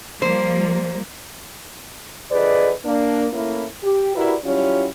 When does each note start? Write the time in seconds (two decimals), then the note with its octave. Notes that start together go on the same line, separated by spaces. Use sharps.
0.22 F3 G3 A#3 C5
2.32 D3 F3 G#4 B4 D5 D#5
2.85 A#3 D4
3.33 A3 A#3 C#4 E4
3.82 G4
4.16 E4 F#4 G4 A#4 B4 D5
4.45 F#3 G3 C#4 E4 F4 G4